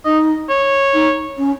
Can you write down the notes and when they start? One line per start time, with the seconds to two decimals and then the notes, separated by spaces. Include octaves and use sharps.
0.05 D#4 D#5
0.49 C#5
0.94 D#4
1.38 C#4